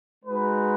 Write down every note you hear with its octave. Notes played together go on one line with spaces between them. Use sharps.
G#3 D#4 F#4 B4